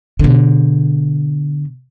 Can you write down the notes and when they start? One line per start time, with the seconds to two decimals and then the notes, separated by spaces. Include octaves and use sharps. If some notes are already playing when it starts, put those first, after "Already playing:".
0.19 B2 D3